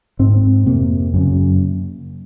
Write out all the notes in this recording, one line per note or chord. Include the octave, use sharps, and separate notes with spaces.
G#2 C4
F2 C3 A#3
F#2 C#3